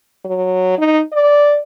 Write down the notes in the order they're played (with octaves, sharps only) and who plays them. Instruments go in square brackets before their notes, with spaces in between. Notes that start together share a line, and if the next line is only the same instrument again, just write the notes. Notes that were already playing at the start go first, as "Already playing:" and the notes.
[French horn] F#3
D#4
D5